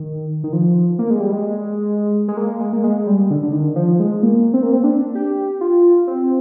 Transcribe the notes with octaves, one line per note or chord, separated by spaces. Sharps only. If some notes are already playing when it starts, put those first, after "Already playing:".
Already playing: D#3
D#3
F3
A#3
G#3
G3
G#3
G#3
A#3
G#3
A#3
G#3
G3
D3
D3
D#3
F3
G#3
A#3
C4
A#3
C4
D4
G4
F4
C4